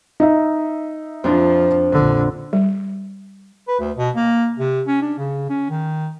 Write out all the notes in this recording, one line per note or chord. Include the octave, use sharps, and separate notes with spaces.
D#4 D#5 E5
F2 F3 D4
A#1 D3
G3
B4
D2
B2
A#3
C3
C#4
D4
C#3
C#4
D#3